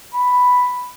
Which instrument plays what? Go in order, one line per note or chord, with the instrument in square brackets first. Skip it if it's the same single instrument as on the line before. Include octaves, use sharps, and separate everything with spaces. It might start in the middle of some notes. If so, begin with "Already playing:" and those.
[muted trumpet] B5